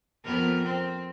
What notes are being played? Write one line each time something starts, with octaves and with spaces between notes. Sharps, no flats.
F2 B3 A#4
C4